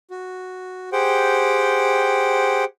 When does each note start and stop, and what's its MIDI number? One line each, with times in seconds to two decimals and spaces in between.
0.11 0.90 66
0.92 2.65 67
0.92 2.65 68
0.92 2.65 72
0.92 2.65 78
0.92 2.65 79